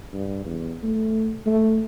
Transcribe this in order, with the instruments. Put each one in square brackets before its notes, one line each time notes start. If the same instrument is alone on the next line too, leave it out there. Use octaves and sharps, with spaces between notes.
[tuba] G2
E2
A3
A3